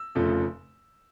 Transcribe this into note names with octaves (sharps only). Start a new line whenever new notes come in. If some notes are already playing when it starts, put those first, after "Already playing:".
Already playing: E6
F1 F2 C#3 F3 A3